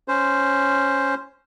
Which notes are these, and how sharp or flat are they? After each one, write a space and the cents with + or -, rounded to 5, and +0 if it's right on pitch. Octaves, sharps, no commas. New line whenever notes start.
C#4 +0 C5 +0